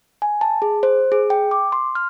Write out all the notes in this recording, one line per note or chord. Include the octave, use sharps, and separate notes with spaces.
G#5
A5
G#4
C5
G#4
G5
D6
C6
F6